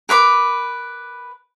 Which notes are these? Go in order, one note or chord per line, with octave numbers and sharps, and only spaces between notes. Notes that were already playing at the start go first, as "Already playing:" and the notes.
A#4 B4 C#6 D6